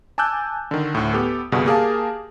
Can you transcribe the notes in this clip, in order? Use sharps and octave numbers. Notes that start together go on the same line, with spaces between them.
G#5 A5 D6 E6 F#6 G6
D3 D#3
D2 A2
B3 G4 A4
C2 G2 B2 D3 G#4
A#3 G4 G#4 A#4 F5 A5